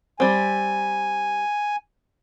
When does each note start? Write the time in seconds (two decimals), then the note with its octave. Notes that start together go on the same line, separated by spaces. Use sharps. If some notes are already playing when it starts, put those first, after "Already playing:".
0.20 G3 C4 G#5